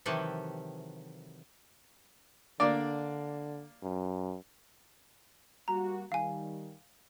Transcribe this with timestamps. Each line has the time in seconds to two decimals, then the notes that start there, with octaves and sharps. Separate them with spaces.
0.06 C3 D#3 E3 F#3 G4 A4
2.60 D3 A#3 D4 D5
3.83 F#2
5.68 G3 A#3 F#4 A#5
6.12 D#3 G3 F5 G#5